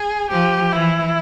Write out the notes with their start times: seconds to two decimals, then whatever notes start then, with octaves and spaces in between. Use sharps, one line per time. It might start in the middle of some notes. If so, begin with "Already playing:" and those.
Already playing: G#4
0.30 F3 G4
0.72 E3 E4